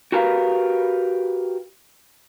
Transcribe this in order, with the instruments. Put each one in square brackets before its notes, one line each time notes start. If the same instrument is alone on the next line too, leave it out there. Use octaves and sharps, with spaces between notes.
[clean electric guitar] F#4 G4 A#4 B4 F5